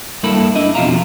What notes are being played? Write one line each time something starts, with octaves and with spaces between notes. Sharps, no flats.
G2 A#3 E4 A4 B5
D4 E4 D#5
F2 B2 F4 E5 F5 A#5